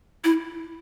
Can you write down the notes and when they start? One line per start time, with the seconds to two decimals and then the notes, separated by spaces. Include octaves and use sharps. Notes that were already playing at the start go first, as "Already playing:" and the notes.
0.24 E4